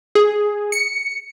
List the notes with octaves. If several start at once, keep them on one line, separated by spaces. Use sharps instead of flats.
G#4
C#7